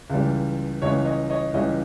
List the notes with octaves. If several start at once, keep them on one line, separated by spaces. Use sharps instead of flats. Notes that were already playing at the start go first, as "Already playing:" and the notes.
C#2 C#3 E3 G3
C#2 C#3 E3 G3 C#5 D#5
C#5 D#5
C#5 D#5
C#2 C#3 E3 G3 C#5 D#5